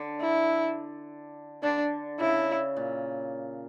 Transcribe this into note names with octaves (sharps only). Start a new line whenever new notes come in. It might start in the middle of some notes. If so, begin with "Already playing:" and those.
Already playing: D3
E4
D3 D4
C#3 E4
A#2